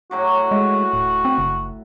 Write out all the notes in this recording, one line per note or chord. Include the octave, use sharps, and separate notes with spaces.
A2 F#3 F#4 D6
G#3
D1
C4
F#1